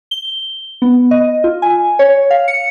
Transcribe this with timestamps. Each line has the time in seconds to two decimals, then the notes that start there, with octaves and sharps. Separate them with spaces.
0.11 G7
0.82 B3
1.11 D#5
1.44 F4
1.62 G#5
1.99 C#5
2.30 F5
2.48 C#7